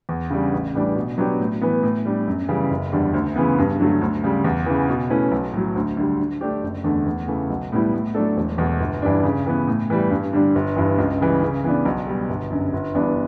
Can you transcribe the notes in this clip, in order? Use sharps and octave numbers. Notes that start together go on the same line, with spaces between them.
E2
C#3 G3 D4
A1
A2 E3 G3 D4
B2
F#3 B3 D4 G4
A2
E3 B3
A2
G3 D4
F#2
C#3 E3 G3
F#1
E2 D3 G3
D2
C#3 E3 B3
G2
D3 F#3 A3
D2
C#3 G3
E2
C#3 E3
B2
A3 C#4 E4 B4
B1
A2 F#3
D2
D3 G3
D3
A3 D4 G4
F#1
E2 D3 A3
E2
C#3 E3 A3
B1
A2 G3 B3 E4
A2
F#3 A3 D4 A4
E1
E2 B2 A3
G1
G2 E3 G3 D4
C#3
E3 B3
A2
E3 G3
G2
D3 G3 D4
G1
G2 E3
C#2
C#3 E3 G3
C#3
E3 B3 D4
B1
B2 G3
G1
F#2 D3
G1
G2 E3 B3 D4